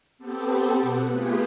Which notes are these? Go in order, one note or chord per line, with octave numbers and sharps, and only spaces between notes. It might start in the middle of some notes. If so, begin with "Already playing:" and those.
B3 C4 G4 A4
B2 F#5
A3 B3 F4 G4 G#4